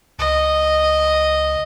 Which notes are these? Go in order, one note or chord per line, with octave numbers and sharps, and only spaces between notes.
C#2 D#5